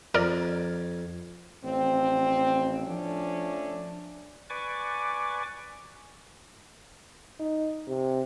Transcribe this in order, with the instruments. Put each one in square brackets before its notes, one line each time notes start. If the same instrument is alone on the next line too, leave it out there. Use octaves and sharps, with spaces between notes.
[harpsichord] F2 [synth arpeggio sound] A#4 D5
[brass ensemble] A1 F3 C4
F3 A3 C#4 D4
[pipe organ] B4 D5 G#5 C#6 D6
[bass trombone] D#4
C3